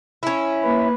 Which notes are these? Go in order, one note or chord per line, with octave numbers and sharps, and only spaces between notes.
C#4 E4
A#3 B4